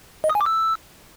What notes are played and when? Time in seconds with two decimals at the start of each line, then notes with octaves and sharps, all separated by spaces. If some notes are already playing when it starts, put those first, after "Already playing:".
0.24 D#5
0.30 D#6
0.35 G#5
0.41 D6
0.46 E6